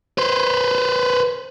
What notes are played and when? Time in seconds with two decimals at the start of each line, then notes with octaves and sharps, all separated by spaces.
0.18 B4 C5